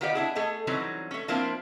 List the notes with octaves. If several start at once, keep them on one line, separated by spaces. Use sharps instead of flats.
D#3 B3 F4 G4 D5 D#5
D4 E4 G#4
A3 G#4 A4 D#5
E3 F#3 G3 C4 C#4 D#4
A3 C#4
F3 A#3 C4 D4 E4 F4